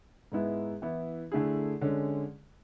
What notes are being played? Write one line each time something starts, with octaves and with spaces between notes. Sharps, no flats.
G#2 G#3 B3 E4
E3 B3 E4
D3 A3 E4 G#4
D3 G#3 C#4